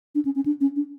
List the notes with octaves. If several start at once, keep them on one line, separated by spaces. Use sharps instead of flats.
D4
C#4
C#4
D4
C#4
D4